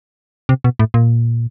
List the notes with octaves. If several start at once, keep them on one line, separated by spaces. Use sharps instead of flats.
C3
B2
A2
A#2